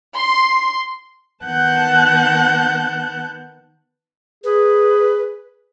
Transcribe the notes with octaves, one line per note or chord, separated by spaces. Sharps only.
C6
D#3 B3 F#5 A5 F#6 G6
G#4 B4